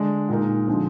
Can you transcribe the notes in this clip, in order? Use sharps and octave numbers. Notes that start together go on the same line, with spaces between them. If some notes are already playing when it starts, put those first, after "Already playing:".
Already playing: D3 G#3 D4
A#2 G#3 D#4 A#4
D3 F3 G#3 C4